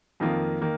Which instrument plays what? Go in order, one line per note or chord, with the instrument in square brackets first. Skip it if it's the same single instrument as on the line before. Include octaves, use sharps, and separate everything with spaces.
[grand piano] F2 D#3 A#3 F4
D#3 A#3